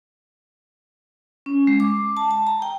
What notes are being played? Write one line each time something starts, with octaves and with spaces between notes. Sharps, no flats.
C#4
G#3
D6
A5
A5
A#5
G5